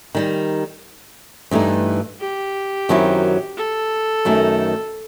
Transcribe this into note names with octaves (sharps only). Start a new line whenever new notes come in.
D#3 G3 D#4
G2 E3 A3 D#4
G4
F#2 D#3 F#3 C4 E4
A4
F#2 D#3 A3